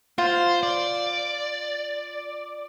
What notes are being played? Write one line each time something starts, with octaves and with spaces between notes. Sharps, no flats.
F4 C5
D5